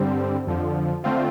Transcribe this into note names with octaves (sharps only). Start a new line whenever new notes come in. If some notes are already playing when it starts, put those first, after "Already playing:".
Already playing: G2 D3 G3 C4
F2 D3 F3
D3 A3 C4 F4